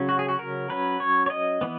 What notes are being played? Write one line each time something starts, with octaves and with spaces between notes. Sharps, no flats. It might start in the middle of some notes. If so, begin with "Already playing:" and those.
Already playing: C#3 F#3 C#4
F#4
G#4
F#4
A#4
F#3 C#4 B4
C#5
C#5
D#5
E3 B3